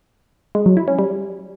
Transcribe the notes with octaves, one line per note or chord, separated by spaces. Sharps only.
G#3
F#3
E4
C#4
G3